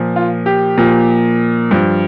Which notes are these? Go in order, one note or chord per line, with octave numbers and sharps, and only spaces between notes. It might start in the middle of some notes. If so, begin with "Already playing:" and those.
Already playing: A#2 F3
F4
G4
A#2 F3
G2 F3